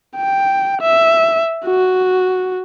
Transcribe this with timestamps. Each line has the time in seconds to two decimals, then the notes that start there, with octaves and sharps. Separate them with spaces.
0.17 G5
0.81 E5
1.66 F#4